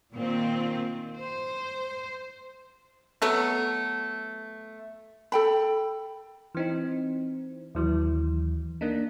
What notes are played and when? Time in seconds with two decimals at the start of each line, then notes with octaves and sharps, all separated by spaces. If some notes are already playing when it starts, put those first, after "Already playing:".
0.14 A#2 D#3 C4 F4
1.17 C5
3.22 F#3 A3 B3
5.32 A4 G5 B5
6.55 E3 C4 D#4
7.75 D#2 E3 F#3
8.81 A#3 D4 D#4